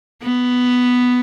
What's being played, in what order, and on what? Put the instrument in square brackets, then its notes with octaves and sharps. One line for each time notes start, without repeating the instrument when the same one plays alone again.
[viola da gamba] B3